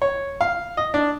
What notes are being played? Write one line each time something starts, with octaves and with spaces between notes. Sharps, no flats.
C#5
F5
D#5
D4